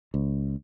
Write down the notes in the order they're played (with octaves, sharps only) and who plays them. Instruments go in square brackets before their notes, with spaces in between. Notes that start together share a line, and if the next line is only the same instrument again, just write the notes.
[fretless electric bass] C#2